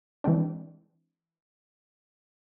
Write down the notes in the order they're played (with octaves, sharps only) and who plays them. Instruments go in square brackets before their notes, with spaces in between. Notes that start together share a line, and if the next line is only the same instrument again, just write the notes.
[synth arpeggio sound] E3 G#3 C4 D4